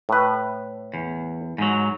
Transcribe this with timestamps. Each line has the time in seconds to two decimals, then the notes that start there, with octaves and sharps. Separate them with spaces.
0.09 A2 B4
0.94 E2
1.58 G#2 F#3